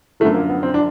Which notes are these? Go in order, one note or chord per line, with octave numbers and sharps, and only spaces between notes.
F#2 D3 F3 A3
A#3
B3
C4
D4